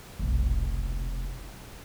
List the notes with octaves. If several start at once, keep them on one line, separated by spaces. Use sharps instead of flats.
F1 B1